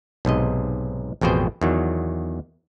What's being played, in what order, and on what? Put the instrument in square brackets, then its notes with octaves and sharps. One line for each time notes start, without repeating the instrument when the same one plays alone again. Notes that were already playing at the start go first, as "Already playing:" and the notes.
[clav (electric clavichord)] B1 G#2 C3 D#5
A1 F2 B2 G#4 C5 G5
E2 D#3 F#3